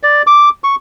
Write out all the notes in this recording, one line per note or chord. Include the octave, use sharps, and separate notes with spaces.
D5
D6
C#6